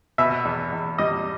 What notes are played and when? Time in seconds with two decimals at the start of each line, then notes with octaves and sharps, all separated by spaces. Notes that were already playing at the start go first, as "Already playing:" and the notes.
0.18 B2 E5
0.45 E2
0.72 E2
0.98 G3 D#5